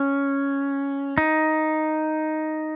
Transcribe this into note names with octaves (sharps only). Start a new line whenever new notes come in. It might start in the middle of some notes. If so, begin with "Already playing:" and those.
Already playing: C#4
D#4